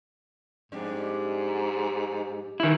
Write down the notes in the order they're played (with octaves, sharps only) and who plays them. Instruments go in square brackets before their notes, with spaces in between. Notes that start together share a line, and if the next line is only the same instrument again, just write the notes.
[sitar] F2 G3 D4 [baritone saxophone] G#2
[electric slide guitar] D#3 E4 [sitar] E3